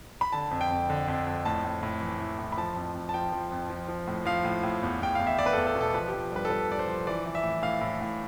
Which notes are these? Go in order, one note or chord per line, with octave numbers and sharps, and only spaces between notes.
B5
D3 A5
F2
G5
F2
D3
F2
F2
A2 A5
A2
A2
E3
E3
A2
B5
F3 A5
F2
F2
A5
F3 G5
F3
F2
F3
F3
A2
F3 F5
A2
A2
E2
E2 G5
E2 F5
E5
E2 D5
B4
E2 A4
A4
B2
A4
F3 B4
F3 G4
G2 B4
A4
G2 B4
G2 D5
C5
F3
E3 D5
E3
E5
A2
A2 F5
A2
A2